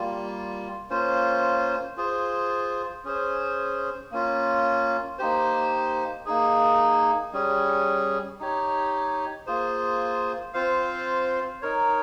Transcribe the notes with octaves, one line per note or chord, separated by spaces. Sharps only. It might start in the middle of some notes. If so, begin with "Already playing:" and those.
Already playing: G3 A#3 F4
A#3 C#4 F4 C5
F4 G#4 C5
C#4 G#4 C5
A#3 C#4 F4
A#3 D#4 G4 C5
A#3 D#4 G#4
G3 C#4 G#4
D#4 G4 C#5
A#3 F4 G#4 C5
C4 F4 C5 F5
D#4 A#4 C#5